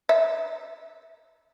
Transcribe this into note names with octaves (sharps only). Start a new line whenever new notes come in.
E5